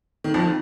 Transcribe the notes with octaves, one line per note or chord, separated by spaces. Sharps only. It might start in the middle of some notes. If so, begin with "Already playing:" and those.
D#3
F2 F3
D#3